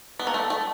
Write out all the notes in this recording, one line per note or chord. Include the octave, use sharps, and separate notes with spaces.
B3
A#3
A3
A3